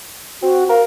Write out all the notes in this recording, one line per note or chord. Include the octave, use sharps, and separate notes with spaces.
C4 F#4
A#4 F5